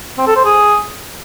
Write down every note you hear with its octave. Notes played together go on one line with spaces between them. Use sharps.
C4
A4
C5
G#4